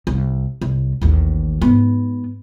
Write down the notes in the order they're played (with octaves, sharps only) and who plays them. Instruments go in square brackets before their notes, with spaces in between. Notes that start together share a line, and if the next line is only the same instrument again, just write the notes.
[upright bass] C2
C2
A1 D#2
G#2 B3